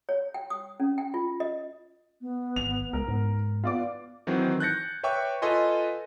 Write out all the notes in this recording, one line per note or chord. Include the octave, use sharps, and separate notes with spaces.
C#5
G5
D#6
C#4
G5
F4
D#5
B3
G#1 F7
C#2 A#4
G#2
B3 F4 D5 D6
D#3 E3 F#3 C4
F#6 G6 A6 A#6 C#7
B4 C#5 E5 G5 C#6 D6
F4 A4 B4 D#5 G#5 C6